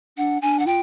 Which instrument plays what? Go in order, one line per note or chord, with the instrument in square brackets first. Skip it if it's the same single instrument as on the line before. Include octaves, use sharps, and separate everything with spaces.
[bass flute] D4 [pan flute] F#5
[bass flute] D4 [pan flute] G#5
[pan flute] F#5
[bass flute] F4 [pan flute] G5